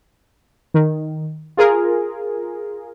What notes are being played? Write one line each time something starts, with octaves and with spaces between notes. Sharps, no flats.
D#3
F4 G#4 A#4